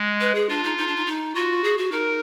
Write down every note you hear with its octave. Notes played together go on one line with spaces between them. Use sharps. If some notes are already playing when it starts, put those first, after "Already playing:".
Already playing: G#3
B4
G#4
D4 F4
D#4
D#4
D4
D#4
D#4
F4 F#4
G#4
F#4
D#4 A#4